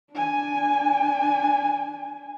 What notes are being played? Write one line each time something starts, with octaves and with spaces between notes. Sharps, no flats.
D4 G#5